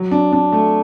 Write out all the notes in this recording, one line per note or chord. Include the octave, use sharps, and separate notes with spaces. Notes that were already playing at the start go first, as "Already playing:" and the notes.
Already playing: F#3
D4
D4
A3